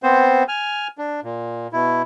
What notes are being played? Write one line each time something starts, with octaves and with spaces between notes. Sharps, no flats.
B3 C4 C5
G#5 F6
D4
A#2
B2 E4